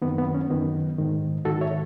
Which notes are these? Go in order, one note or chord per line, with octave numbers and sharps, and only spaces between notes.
F#2 D#3 B3
B3
C#4
F#2 D#3 B3
G#2 D#3
G#2 D#3 F#4 A4
C#5 E5